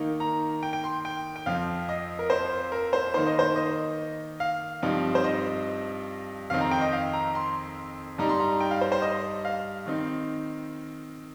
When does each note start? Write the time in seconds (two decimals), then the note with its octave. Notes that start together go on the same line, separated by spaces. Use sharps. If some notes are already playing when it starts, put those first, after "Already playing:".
Already playing: D#3 A#3 D#4
0.20 A#5
0.63 G5
0.73 G5
0.84 C6
1.05 G5
1.36 G5
1.46 F2 F3 C4 F5
1.89 D#5
2.19 A#4
2.30 C5
2.72 A#4
2.93 C5
3.14 D#3 A#3 D#4 C5
3.27 D#5
3.39 C5
3.56 D#5
4.40 F5
4.83 G2 F3 C4 D#4
5.15 C5
5.24 D#5
6.50 F2 D#3 C4 D#4 F5
6.61 A#5
6.71 G5
6.81 D#5
6.93 F5
7.13 A#5
7.35 C6
8.18 G2 G3 D#4 A#5
8.29 C6
8.40 A#5
8.60 G5
8.71 F5
8.81 C5
8.92 C5
9.02 D#5
9.45 F5
9.86 D#3 C4 D#4